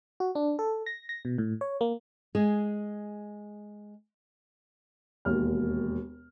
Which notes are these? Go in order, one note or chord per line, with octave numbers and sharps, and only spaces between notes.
F#4
D4
A4
A#6
A#6
B2
A2
C#5
A#3
G#3 G#4
E1 D#2 F6